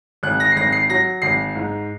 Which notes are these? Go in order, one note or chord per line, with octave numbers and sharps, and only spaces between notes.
G#1 F#6
A#6
C7
G#1 A#6
C7
F#3 A#6
G#1 C7
G#2